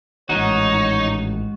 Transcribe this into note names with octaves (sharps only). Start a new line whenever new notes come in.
A1 G#2 D#3 D#4 F#4 C#5